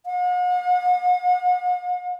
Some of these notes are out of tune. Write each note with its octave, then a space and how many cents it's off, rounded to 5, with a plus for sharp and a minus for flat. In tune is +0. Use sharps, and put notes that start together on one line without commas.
F#5 -45